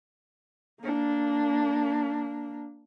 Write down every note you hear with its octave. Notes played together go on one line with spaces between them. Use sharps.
A#3 D4